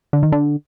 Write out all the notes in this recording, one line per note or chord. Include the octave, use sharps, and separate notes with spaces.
D3
D#3
D3